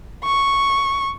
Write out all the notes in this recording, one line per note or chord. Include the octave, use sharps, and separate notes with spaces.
C#6